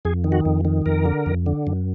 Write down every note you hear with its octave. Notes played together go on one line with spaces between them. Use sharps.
F2 G#4
D#3
F#4
F2
D#3
F2 A#4
D3
F2
D3
F#2